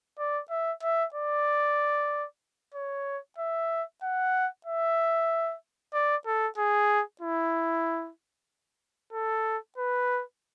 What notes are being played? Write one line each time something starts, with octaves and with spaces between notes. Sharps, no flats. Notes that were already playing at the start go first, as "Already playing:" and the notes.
D5
E5
E5
D5
C#5
E5
F#5
E5
D5
A4
G#4
E4
A4
B4